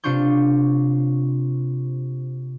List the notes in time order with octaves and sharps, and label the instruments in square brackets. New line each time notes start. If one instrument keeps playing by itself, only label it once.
[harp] C3 D4 F4 C#6 G6